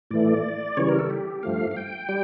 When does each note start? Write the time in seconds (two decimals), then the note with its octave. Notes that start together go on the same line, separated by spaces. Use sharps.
0.11 A2 E3 A3 D5
0.77 C#3 E3 G3 C#5
0.89 A#4
0.99 A4
1.10 G4
1.43 G2 F3 A3 F5
1.71 F5
1.77 G5
2.09 G3